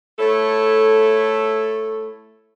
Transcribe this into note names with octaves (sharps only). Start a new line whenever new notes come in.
A3 E4 A4 C#5